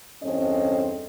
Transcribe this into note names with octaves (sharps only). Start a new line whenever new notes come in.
E2 G2 C4 C#4 A4 D#5